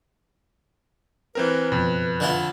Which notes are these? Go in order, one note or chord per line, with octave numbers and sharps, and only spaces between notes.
E3 C4 A#4 B4
F#1 F2 B2
D3 E4 F4